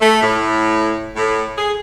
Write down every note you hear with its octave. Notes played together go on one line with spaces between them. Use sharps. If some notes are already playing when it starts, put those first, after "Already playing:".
A3
A2
A2
G#4